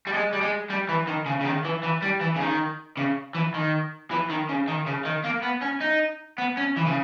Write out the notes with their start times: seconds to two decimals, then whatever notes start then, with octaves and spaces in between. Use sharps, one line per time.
0.07 G3
0.13 G#3
0.33 G3
0.41 G#3
0.70 G3
0.89 E3
1.08 D#3
1.26 C#3
1.41 C#3
1.45 D#3
1.65 E3
1.83 E3
2.02 G3
2.21 E3
2.36 C#3
2.40 D#3
2.97 C#3
3.35 E3
3.54 D#3
4.11 E3
4.30 D#3
4.49 C#3
4.68 D#3
4.87 C#3
5.05 D#3
5.24 A#3
5.43 B3
5.62 C#4
5.81 D#4
6.38 B3
6.57 C#4
6.76 E3
6.86 C#3